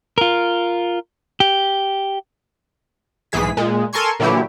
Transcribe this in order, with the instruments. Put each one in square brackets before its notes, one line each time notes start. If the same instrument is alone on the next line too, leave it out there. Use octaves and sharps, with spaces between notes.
[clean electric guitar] F4 A#4
G4
[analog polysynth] B1 G#2 E3 G#4 B6
A#2 G#3
A4 A#4 G#5 C6 C#6 G#6
A#2 D3 E3 F#3 E4 G4